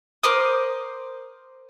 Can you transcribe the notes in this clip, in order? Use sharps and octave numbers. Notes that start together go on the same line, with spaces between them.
A#4 C5 D6 D#6